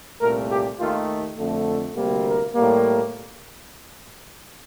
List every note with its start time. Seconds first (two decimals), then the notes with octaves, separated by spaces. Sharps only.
0.21 C2 A#2 A3 A#4
0.50 G4
0.79 D#2 D#3 A3 F4
1.38 F2 D3 A3
1.96 D2 C3 G3 A#3
2.26 A#4
2.55 A2 G3 A#3